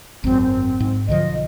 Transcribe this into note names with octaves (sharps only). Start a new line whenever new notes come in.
G#1 F#2 C4
C4
G#2
B1 D3 F3 D#5